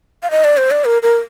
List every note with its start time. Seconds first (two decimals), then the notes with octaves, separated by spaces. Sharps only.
0.23 F5
0.31 D#5
0.44 D5
0.57 C5
0.71 D5
0.85 A#4
1.02 A#4